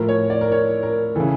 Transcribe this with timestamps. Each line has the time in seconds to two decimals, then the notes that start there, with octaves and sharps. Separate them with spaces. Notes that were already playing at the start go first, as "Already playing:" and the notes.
Already playing: A2 F3 A#4
0.09 C#5
0.30 D5
0.41 A#4
0.52 C#5
0.83 A#4
1.15 C#3 E3 A4